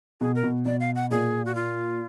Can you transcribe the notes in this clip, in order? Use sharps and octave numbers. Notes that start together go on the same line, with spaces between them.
B2 G#4
A#4
B2
B2 D5
F5
F#5
A#2 G#4
F#4
F4